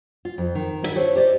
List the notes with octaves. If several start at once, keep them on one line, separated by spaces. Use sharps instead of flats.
F4
F2
D#3
G2 E4 E5
D4 F4 G4 C5 C#5
G4 C5 D5 D#5